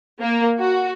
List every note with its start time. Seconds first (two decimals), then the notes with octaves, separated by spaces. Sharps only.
0.21 A#3
0.59 F#4